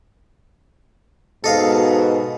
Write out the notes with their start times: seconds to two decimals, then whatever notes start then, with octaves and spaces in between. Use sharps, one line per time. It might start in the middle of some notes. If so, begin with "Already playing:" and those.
1.44 G#2 B2 A4 D#5 F5